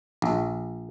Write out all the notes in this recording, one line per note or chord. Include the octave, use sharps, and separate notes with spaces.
A#1